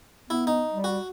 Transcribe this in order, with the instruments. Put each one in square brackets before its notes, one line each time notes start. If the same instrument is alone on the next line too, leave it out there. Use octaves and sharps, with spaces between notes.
[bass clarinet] B3 [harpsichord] E4
[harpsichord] D#4
[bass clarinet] G3
[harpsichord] F#4